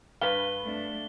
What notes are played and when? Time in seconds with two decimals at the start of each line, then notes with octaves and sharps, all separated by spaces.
0.21 G2 B4 F5 G7
0.62 A3 D4